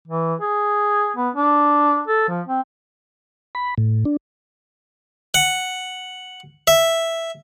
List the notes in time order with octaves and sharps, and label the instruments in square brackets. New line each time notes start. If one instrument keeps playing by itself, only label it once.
[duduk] E3
G#4
B3
D4
A4
F3
C4
[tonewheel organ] B5
A2
D4
[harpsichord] F#5
E5